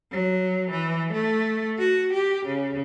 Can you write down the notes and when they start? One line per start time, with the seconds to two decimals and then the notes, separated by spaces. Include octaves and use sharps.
0.12 F#3
0.71 E3
1.13 A3
1.79 F#4
2.13 G4
2.45 C#3